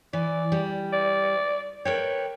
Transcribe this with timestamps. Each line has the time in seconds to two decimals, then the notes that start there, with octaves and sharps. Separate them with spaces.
0.13 E3 D5
0.52 G3
0.93 D5
1.85 A#4 B4 C#5 G5